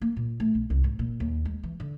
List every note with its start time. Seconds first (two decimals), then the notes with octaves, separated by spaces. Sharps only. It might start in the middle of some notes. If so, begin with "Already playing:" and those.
0.02 A#3
0.17 A#2
0.40 A3
0.55 B1
0.70 C2
0.84 G#2
0.99 A#2
1.20 D#2
1.45 G#3
1.63 E3
1.80 D3